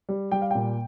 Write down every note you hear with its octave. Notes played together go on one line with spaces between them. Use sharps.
G3
G3 G5
F5
A#2 G5